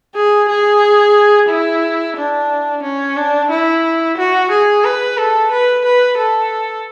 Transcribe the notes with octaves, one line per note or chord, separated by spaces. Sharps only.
G#4
G#4
E4
D4
C#4
D4
E4
F#4
G#4
B4
A4
B4
B4
A4